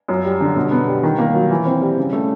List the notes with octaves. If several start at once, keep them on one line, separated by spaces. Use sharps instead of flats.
F#2
G3
D3
B2
B3
G3
D#3
A#3
F#3
E3
C4
G3
C#3
A3